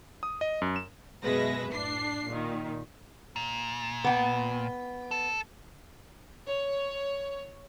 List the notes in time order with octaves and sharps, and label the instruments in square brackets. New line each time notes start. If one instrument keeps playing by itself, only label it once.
[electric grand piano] D#6
D#5
F#2
E7
[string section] F#2 B2 G#3 B4 E5 A#6
A2 D4 C7
A#2 D#3
[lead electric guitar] A#2
[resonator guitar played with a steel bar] B3 G5
[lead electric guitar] A4
[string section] C#5